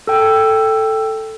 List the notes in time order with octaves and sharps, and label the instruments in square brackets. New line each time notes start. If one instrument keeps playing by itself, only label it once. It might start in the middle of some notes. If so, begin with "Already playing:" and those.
[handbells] A4 G5